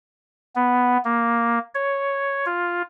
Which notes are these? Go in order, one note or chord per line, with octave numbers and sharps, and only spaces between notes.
B3
A#3
C#5
F4